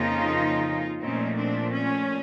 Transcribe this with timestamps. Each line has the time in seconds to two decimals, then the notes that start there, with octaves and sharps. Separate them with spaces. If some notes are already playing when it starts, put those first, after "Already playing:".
Already playing: F2 C#3 F3 A#3 D#4 F4
1.00 A#2 F3 A3 C4 C#4 D#4
1.36 C4 D4
1.72 C#4